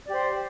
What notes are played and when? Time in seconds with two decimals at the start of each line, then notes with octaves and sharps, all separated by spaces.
0.06 D5
0.09 G4
0.12 C5